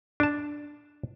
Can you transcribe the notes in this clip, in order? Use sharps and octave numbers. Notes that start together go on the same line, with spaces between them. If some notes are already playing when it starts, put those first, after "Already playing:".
D4 A5